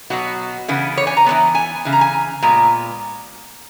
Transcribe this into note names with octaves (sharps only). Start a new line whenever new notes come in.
B2 F#3 B3 F#4
C#3 E3 B3
C#5
G#5
A#5
E3 G#3 B3
G#5
C#3 E3
A#5
G#5
A#2 G#3 B3 A#5